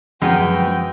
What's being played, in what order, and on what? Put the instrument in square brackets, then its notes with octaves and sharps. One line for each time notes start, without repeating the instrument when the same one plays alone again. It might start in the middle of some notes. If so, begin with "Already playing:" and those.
[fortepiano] F#2 [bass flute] F3 [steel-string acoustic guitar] G#3 B3 G#4 [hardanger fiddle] G5